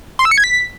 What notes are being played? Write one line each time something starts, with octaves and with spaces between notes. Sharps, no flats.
C6
E6
C#7
G#6
B6